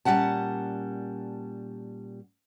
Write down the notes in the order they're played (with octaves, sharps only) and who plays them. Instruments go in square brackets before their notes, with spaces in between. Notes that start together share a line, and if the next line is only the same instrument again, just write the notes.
[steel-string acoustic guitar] A#2 F3 G3 C#4 F#5 A5